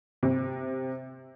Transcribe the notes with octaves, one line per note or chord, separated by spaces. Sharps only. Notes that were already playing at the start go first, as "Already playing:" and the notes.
C3